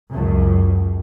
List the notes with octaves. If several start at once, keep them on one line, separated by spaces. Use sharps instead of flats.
C#2 F#2